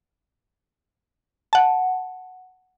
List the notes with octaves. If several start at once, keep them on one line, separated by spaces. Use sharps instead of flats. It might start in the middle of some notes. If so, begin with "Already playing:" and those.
F#5 A5